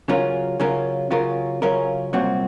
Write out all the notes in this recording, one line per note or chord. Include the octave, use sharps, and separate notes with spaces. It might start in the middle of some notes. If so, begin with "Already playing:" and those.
C#3 F#3 C#4 F4 A#4
C#3 F#3 C#4 F4 A#4
C#3 F#3 C#4 F4 A#4
C#3 F#3 C#4 F4 A#4
C2 A#2 F#3 C4 F#4